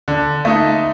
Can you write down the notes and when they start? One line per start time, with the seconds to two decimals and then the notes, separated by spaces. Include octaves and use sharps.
0.08 D3
0.45 A3 D#4